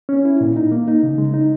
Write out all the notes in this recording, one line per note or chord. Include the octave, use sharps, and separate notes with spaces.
C#4
E4
A#2
D#4
A#3
D#4
C#3
G#3
D#4